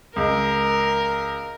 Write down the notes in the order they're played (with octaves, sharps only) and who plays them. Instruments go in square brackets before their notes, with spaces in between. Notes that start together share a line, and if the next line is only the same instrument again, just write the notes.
[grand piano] C#2 [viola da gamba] A#4